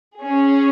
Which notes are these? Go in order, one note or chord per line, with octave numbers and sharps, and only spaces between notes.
C#4 G#4